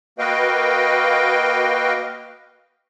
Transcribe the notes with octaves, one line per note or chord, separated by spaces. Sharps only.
A#3 F#4 B4 D#5 F5 G5